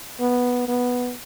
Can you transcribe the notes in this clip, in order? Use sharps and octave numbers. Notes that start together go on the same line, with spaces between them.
B3
B3